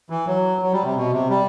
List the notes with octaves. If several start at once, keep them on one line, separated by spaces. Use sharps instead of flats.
E3
F#3
F#3
G3
C3
B2
C3
G3